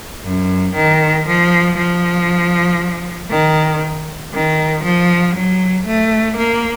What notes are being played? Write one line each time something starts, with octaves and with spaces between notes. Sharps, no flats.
F#2
D#3
F3
F3
D#3
D#3
F3
F#3
A3
A#3